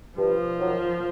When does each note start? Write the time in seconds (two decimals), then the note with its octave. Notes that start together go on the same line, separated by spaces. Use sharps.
0.17 G2 F3
0.60 D#3 F#3